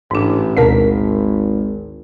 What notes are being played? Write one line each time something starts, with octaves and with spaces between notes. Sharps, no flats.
A1 G#2 D4
G#1 D2 B2 A#4 A5 B6